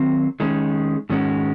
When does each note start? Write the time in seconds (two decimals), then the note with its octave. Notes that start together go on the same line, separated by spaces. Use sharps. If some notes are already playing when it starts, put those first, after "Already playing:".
Already playing: D#3 F#3 C4
0.40 D#3 G#3 C#4
1.09 G#2 D#3 G#3 C#4 F#4